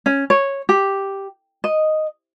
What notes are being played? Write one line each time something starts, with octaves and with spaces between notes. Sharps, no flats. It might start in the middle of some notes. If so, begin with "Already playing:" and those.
C#4
C#5
G4
D#5